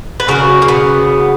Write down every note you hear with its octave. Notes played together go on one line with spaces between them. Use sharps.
B4
C#3 F#3 F#4 A#4
A#3
B3